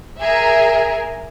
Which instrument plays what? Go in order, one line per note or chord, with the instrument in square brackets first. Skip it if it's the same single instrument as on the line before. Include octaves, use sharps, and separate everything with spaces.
[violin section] G#4 A#4 E5